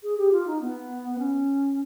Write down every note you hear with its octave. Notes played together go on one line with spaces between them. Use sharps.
G#4
G4
F4
D#4
B3
C#4